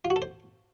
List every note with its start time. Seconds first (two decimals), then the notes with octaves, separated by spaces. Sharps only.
0.05 F4
0.10 F#4
0.16 A4
0.22 C5